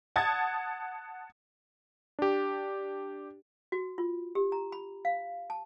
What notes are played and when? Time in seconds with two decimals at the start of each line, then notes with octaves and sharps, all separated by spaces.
0.16 F#5 A5 D#6 G#6 A6
2.19 D4 G4
3.72 F#4
3.98 F4
4.35 G4
4.52 A#5
4.72 B5
5.05 F5
5.50 A5